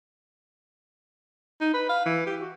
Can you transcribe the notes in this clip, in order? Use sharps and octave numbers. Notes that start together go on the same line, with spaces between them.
D#4
B4
F5
E3
G4
F#4